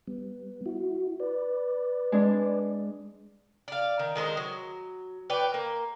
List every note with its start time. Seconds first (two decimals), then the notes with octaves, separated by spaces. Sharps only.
0.08 G3 B3
0.66 E4 F#4
1.20 B4 D5
2.12 G#3 D4
3.68 D5 F5
3.99 D#3
4.15 D#3 G#3 A4 C5
4.37 F#3
5.30 B4 C#5 D5 G5
5.54 A#3